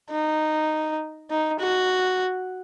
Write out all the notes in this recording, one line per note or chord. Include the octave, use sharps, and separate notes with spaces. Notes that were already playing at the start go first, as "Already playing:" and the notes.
D#4
D#4
F#4